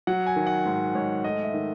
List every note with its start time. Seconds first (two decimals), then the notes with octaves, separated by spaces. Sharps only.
0.07 F#3 F#5
0.26 G#5
0.36 D#3
0.47 F#5
0.65 G#2
0.95 G#2 C#5
1.24 A3 D#5
1.44 E5
1.54 D#3